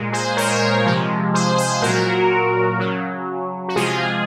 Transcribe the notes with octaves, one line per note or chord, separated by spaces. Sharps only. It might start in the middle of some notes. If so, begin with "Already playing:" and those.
Already playing: A#2 G#3
G#4 C5
A#4 C#5
C3 F3 G#3
G#4 C5
G#4 C5
A#2 F#3 F#4 A#4
C#3 F#3
F#4
C3 F3 G#3 F4 G#4